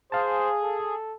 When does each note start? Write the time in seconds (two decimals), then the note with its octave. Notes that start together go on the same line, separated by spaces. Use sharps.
0.12 G#4 C5 F5 A5
0.63 A4